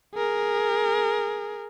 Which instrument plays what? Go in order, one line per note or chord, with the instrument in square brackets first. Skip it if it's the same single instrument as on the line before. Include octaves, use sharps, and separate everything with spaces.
[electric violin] G#4 A#4